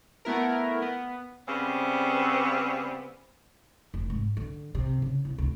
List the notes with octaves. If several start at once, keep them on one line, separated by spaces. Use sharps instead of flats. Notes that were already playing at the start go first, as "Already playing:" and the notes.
A3 B3 E4 A#4
B3
C#3 G3 B3 C4
F1
G#2
D3
C3
C#3
C2
D2